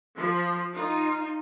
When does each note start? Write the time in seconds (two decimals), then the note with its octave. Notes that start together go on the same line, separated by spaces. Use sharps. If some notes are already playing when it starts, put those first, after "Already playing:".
0.16 F3
0.73 D#4 F4